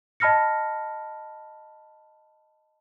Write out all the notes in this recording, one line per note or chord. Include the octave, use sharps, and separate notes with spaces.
D#5 A5 B5 F6 A#6 C#7